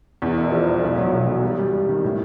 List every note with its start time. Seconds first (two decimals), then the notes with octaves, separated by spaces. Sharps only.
0.22 E2
0.38 E1
0.52 F3
0.68 E1
0.83 B1
0.98 F#3
1.12 B1
1.28 B1
1.44 G3
1.59 G3
1.73 G3
1.89 D#3
2.04 A2